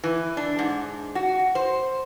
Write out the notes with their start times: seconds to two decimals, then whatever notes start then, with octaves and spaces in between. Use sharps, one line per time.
0.04 E3
0.37 D4
0.59 G#2
1.15 F#4
1.55 C5